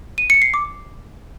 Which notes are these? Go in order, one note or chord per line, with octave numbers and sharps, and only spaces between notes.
D#7
C#7
C7
D6